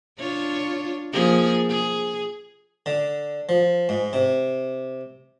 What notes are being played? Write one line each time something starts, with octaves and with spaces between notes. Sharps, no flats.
D4 F4 C#5
F3 A#3 G#4
G#4
D3
F3
G#2
C3